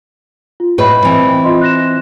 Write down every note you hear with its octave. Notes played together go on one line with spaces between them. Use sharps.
F4
A2 B4 C#5 D#5 B5
E3 C4
F4 D#5 C6
F#6 A#6 E7